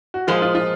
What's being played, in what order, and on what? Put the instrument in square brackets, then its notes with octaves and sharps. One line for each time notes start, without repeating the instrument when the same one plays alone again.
[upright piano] F#4
[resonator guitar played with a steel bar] A#2 F3 G#3 [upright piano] F4
[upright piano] F4
F4